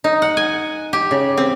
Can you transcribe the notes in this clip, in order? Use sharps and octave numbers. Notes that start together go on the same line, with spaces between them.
D#4
F#5
G#5
G4
C#3
C4